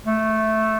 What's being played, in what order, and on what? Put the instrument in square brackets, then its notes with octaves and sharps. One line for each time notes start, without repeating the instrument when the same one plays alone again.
[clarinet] A3